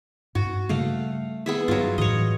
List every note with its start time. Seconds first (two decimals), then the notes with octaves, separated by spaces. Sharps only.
0.35 G2 F#4
0.69 C#3 G3 A3 A#3 F5
1.46 B3 G#4 E5
1.68 G2 F#3 F4
1.98 A2 E3 F#3 C#5 D#5